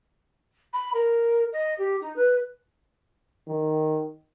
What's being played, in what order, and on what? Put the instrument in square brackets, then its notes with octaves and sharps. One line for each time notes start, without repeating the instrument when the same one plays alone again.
[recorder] B5
A#4
D#5
G4
D#4
B4
[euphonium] D#3